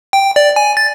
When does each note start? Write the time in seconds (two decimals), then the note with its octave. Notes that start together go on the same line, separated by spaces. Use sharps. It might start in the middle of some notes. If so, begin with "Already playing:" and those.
0.13 G5
0.36 D5
0.56 G#5
0.77 A6